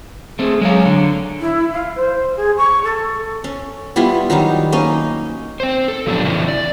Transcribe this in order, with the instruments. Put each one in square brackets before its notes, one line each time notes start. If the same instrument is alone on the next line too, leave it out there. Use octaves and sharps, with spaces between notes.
[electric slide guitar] A3 C4 [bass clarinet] G#4
[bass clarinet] F#3 [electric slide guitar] G#3 G#4 F5
[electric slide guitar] D3
[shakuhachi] E4
F5
C5
G#4
C#6
A4
[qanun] C#4
G3 B3 E4 F4
D#3 F#3 G3 D#4
A#3 C#4 D#4 D#5
[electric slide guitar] C4 C5
A4
F3 F#3 A3 B3 D4 G4
C#3 E3 C#4 E4
D5